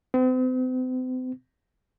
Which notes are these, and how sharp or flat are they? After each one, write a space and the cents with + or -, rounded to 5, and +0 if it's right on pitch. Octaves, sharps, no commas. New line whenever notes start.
C4 -40